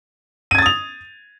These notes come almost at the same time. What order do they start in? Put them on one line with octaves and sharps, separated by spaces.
D#7 G#6 A6 D#6 F7